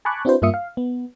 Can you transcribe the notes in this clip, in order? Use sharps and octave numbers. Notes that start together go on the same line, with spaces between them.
G#5 A5 B5 C#6 D6 F#6
C4 D4 E4 F#4 B4 C5
G2 A#3 F4 E5 D#6 C#7
F5
B3